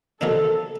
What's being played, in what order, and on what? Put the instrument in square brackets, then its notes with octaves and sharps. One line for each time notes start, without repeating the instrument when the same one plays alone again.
[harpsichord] C3 D#3 F#3 A#3 D4 [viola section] A4